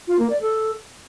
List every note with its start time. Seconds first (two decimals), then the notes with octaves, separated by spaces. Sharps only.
0.08 F4
0.19 A#3
0.30 D5
0.41 A4